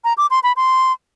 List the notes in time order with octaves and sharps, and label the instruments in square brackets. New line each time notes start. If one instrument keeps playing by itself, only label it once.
[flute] A#5
D6
C6
B5
C6